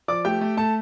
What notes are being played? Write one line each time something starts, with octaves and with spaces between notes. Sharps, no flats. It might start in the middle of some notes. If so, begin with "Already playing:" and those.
F3 D5 D6
A3 G4 G5
A3
A3 A4 A5